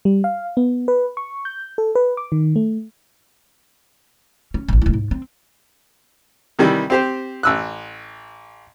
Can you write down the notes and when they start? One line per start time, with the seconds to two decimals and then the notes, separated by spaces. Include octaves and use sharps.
0.05 G3
0.24 F5
0.57 B3
0.88 B4
1.17 C#6
1.45 G6
1.78 A4
1.95 B4
2.17 D6
2.32 D#3
2.56 A3
4.54 C#4
4.68 A1 D3
4.82 D#1 E4
4.93 G#2
5.11 C4
6.59 C3 D#3 E3 G3
6.90 C4 G4 C5
7.43 A1 E6 F#6